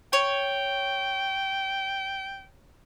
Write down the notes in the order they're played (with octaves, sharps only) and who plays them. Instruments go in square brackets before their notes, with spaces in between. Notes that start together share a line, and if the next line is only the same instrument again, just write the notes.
[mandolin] C#5 [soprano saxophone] G5